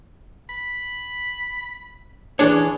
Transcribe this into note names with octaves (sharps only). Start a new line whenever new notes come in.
B5
E3 C#4 D4 G#4 C#5